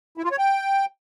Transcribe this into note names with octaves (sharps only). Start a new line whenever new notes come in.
E4
F4
C#5
G5